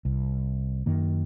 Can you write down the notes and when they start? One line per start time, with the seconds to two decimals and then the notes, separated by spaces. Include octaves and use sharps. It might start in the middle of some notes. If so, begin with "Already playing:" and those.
0.05 C2
0.86 F#2 D#3 A#3